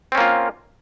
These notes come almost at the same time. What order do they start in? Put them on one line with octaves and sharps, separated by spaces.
C4 C#4 A#3 F4